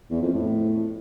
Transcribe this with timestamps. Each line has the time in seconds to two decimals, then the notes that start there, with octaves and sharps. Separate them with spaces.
0.10 E2
0.22 F2
0.33 A2